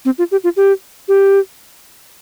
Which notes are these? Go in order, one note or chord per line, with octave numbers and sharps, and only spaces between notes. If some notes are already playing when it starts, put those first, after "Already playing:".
C4
F4
G4
F4
G4
G4